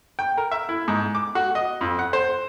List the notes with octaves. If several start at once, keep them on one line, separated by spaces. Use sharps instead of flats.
G5
A#4
E5
E4
G#2
D6
F#4
D#5
F2
F#5
C5